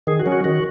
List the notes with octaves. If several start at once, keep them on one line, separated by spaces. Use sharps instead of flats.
D#3 G#4
F#4
F#3 C#4
F#4
D#3 F#4